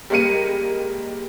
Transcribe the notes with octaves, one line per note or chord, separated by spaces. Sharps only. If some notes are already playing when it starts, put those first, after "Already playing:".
G3 G#3 A#3 A#4 C#7 D#7